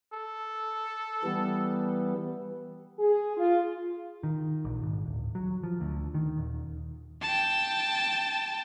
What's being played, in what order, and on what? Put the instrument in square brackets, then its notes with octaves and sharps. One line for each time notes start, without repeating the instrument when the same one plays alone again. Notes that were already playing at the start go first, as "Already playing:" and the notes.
[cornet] A4
[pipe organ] E3 G3 B3
[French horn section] G#4
F4
[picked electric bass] D#3
A#1
G#1
D1
F#3
F3
D2
D#3
D#1
[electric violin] G5 A5